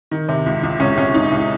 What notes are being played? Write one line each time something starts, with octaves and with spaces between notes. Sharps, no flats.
D#3
C3
C#2
C#2
C#2 C#4
C#2 C#4
C#2 D#4
C#2 E4